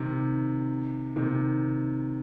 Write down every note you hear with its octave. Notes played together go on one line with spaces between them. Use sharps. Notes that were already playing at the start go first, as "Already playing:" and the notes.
Already playing: C3 D#3
C3 D#3